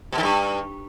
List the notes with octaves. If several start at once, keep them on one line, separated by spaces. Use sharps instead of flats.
B2
D#3
G2